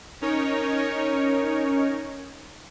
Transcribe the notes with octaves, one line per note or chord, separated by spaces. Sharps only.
C#4 D#4 A#4 C#5